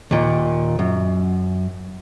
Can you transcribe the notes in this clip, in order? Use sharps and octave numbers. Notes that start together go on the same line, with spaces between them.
D#2 A#2
F#2